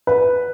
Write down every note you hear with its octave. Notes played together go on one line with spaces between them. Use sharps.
B4